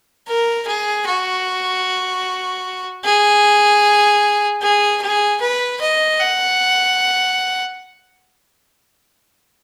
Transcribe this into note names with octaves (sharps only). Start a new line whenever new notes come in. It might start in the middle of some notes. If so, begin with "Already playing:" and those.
A#4
G#4
F#4
G#4
G#4
G#4
B4
D#5
F#5